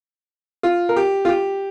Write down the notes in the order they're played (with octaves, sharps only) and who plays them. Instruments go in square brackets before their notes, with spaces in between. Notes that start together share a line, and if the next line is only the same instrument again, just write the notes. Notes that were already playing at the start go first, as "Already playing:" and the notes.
[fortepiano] F4
A#4
G4
F4
G4